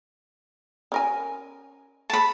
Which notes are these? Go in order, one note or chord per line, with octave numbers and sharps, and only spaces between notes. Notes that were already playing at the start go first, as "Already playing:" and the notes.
C#4 A#4 G#5
A5 B5